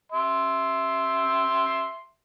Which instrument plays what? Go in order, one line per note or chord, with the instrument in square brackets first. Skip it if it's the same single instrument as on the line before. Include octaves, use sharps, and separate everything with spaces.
[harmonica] E5 C6